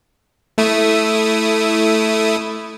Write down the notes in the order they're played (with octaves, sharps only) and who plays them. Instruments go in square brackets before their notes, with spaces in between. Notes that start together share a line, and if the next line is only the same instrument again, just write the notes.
[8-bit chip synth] A3 E4 D#6